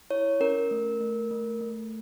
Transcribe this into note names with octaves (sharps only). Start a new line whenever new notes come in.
E4 C#5
C#4 A#4
A3
A3
A3
A3